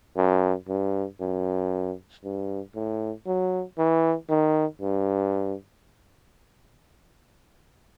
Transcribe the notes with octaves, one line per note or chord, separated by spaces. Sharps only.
F#2
G2
F#2
G2
A2
F#3
E3
D#3
G2